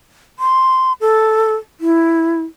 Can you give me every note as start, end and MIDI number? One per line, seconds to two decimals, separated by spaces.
0.39 0.93 84
1.01 1.55 69
1.80 2.41 64